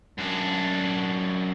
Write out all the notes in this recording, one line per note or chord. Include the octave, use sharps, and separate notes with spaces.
F#2 D4